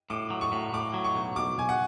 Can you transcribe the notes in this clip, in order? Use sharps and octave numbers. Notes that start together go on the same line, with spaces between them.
A2 D6
F#3
C#6
A2
A2 D6
F#3
C#6
B1
B1 D6
B1 G#5
F#5